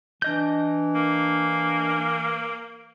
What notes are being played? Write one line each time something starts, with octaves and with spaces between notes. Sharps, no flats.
E3 D4 D#5 G6
A#3